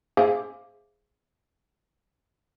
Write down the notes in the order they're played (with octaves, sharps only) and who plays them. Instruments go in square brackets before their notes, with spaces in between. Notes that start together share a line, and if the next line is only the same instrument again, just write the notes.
[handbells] G#4 C5 E5 F5 G#5 D6